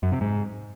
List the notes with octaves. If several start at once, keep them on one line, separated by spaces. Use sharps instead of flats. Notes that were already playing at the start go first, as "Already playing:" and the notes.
F#2
C3
G#2